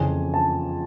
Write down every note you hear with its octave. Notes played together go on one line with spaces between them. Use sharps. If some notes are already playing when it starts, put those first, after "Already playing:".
Already playing: F2 C#3 E3 G#5
A5